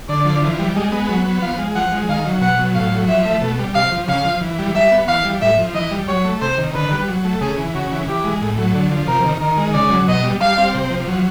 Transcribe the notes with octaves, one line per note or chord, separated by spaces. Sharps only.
D3 D5
F3
E3
G3
G#3 D#5
B3
F#3
B3
F3 F5
G#3
F3 F#5
G#3
D#3 F5
F#3
B2 F#5
F#3
A2 F5
F#3
F3 E5
A3
B2
G3
C3 F5
F3
C#3 F5
F3
E3
G3
G3 E5
B3
E3 F5
G3
A2 E5
F3
E3 D#5
G3
F#3 C#5
A3
C3 C5
D#3
D3 B4
G3
F#3
A3
C#3 G#4
E3
C#3 F#4
E3
E3 G4
G#3
A2
F#3
D3
F3
C3 A#4
D#3
D#3 A#4
G#3
C#3 D5
F#3
B2 D#5
G3
G3 F5
C4
C3
F3
F#3